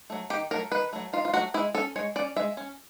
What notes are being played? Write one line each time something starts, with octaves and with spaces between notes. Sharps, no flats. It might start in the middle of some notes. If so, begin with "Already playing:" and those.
F#3 A3
D#3 G4
F#3 A3 A#4
D#3 B4
F#3 A3
D#3 F4
F4
F#3 A3 F#4
G#3 E4
C#4 A4
G#3 C#5
C#4 D5
G#3 E5
C#4